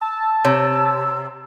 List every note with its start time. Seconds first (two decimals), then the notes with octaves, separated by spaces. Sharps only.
0.01 A5 E6
0.45 C3 C#5 E6